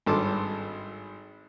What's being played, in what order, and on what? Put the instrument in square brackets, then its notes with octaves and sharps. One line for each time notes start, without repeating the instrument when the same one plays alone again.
[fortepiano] G#1 G2 A4 A5 C6 D6